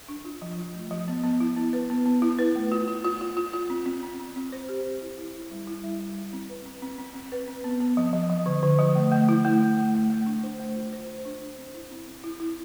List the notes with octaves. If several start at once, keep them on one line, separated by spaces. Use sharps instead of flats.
D4
F4
F3
F4
A3
F3
B3
B3
E4
B3
B4
B3
B3
E4
B4
A3
F4
F4
F4
F4
F4
F4
C4
C4
C4
C4
C4
C5
G4
G4
E4
E4
E4
G3
E4
G3
G3
E4
C4
B4
C4
C4
C4
C4
B4
C4
B3
B3
F3
F3
F3
D3
D3
F3
A3
A3
E4
A3
A3
A3
A3
A3
D4
C5
A3
F4
C5
C5
D4
C5
C4
E4
C4
C4
E4
E4